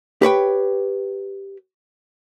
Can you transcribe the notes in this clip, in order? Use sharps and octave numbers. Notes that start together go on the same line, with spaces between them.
G4 B4 C#5 G5